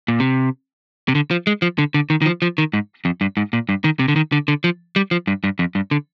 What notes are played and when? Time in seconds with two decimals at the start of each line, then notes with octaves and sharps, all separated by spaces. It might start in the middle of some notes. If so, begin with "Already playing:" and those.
0.08 A#2
0.20 C3
1.08 C3
1.15 D3
1.31 F3
1.47 G#3
1.62 F3
1.78 D3
1.94 D3
2.10 D#3
2.22 D#3
2.26 F3
2.42 F3
2.58 D#3
2.73 G#2
3.05 F2
3.21 G2
3.37 G#2
3.53 A#2
3.69 G2
3.84 D#3
3.99 C3
4.08 D3
4.16 D#3
4.32 D3
4.48 D3
4.64 F3
4.96 G3
5.11 F3
5.27 G2
5.44 G2
5.59 F2
5.75 G2
5.91 D3